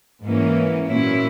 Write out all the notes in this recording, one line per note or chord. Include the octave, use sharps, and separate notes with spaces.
G#2 E3 A#3 C#4
A#2 F#3 A#3 C#4 E4